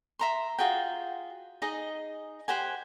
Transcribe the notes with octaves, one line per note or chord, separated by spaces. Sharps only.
E5 A#5 C6
F4 F#4 G#4 G5
D#4 G#4 D#5
G4 C5 F#5 G#5